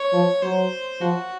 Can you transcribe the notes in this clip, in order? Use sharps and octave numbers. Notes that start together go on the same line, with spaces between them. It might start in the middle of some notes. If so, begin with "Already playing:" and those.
Already playing: C#5
F3
F#3 C5
F3 F#4